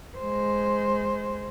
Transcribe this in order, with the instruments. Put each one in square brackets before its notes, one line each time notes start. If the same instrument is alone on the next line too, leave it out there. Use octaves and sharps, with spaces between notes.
[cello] G#3 C5